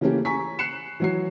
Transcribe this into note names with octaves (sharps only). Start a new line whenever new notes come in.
C#3 E3 A3 A#3 C#4 G4
G#5 A#5 C#6 B6
F#6 C7 C#7 E7
E3 F#3 C7